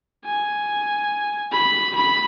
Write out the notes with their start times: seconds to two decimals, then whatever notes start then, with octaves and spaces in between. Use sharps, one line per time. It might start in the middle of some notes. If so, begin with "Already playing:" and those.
0.25 G#5
1.52 B5
1.95 B5